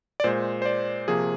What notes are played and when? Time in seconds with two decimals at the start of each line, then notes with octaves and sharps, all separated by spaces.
0.20 D5
0.24 A#2 G#3 C5
0.62 C5
0.66 D5
1.08 C3 F3 A#3 G#4